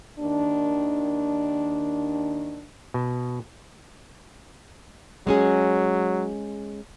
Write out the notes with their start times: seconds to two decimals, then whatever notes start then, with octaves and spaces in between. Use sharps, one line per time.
0.19 D#2 D#3 D4
2.94 B2
5.27 F#3 G#3 C#4 G#4